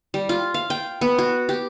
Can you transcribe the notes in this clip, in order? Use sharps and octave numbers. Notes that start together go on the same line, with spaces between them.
G3
F4
F5
G5
B3
F#4
G4